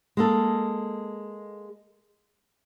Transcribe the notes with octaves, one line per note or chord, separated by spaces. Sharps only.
G#3 A#3 A4